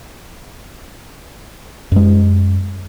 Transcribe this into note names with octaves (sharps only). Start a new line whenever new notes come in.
F#2 G#3